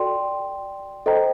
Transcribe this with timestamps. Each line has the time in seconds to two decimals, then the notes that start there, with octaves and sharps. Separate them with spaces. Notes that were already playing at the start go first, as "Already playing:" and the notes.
Already playing: F#4 A4 D5 G5 C6
1.06 A4 C5 D#5 G5 A#5